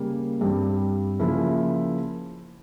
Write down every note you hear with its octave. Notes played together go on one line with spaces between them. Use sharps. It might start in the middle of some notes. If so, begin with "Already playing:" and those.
Already playing: C#3 G3 A#3
G2 G3 C4
C#3 F3 A#3 E4